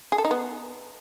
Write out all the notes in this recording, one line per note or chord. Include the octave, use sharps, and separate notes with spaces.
G#4
A4
D#4
B3